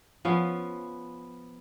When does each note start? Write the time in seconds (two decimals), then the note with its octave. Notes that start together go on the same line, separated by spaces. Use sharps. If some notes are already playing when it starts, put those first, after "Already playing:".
0.25 F3 B3 C#4 F5